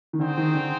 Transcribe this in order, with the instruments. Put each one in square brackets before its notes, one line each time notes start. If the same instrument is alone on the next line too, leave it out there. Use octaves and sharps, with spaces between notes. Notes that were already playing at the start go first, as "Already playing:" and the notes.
[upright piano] D#3
[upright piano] D3 [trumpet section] C4 D#4 G#4 C5 G5
[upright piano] D#3
D3